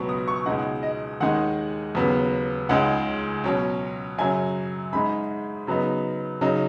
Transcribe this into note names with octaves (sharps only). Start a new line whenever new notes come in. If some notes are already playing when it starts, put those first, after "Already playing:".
Already playing: C#2 B2 F#3 B3 C#6
D#6
C#6
C#2 B2 G#3 D#4 F#5
D#5
D#2 D#3 G#3 D#4 F#5
D#2 C#3 F#3 B3
C#2 C#3 G#3 D#4 F#5
B2 F#3 C#4
F#2 C#3 F#3 G#5
G#2 G#3 D#4 B5
C#3 F#3 B3 D#4
C#3 F#3 D#4